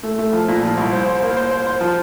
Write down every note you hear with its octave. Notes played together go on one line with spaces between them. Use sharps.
A3
A3
F3
A#2
F3
C2
C5
C5
A#3
C5
C5
C5
F3